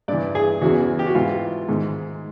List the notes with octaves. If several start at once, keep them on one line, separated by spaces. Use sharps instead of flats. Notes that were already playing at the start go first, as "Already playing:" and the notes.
G2 E3 D5
G#4
E2 C#3 E3 F#4
G4
F#4
G#2 E3 F4
G#2 D#3